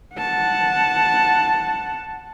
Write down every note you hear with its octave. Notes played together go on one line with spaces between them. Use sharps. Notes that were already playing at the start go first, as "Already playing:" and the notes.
F#5 A5